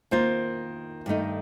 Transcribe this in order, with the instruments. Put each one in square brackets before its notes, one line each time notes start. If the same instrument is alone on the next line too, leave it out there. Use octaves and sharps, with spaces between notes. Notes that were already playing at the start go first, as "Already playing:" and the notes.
[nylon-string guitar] D#3 A#3 F4 [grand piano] C5
[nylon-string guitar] G2 D#3 A3 D#4